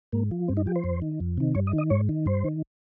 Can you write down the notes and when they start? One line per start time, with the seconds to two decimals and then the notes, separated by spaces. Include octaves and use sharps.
0.12 G#2 A#3
0.31 F3
0.48 G2 C4
0.57 D#4
0.66 F3 G4
0.76 C5
0.84 F2
1.02 D#3
1.20 F2
1.37 C3 D#3
1.55 G2 C#5
1.67 D#5
1.73 D#3
1.78 D#5
1.90 G#2 C#5
2.09 D#3
2.26 G2 C5
2.44 D#3